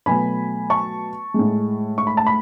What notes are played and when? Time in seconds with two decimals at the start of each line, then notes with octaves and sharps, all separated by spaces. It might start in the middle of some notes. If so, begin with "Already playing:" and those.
0.06 B2 F#3 A3 G#5 B5
0.70 A5 C#6
1.34 A2 G#3
1.98 C#6
2.07 B5
2.17 A5
2.27 B5